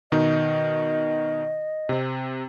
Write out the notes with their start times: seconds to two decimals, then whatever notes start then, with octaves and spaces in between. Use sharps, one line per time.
0.12 B2 D#3 D#4 D#5
1.89 C3 C4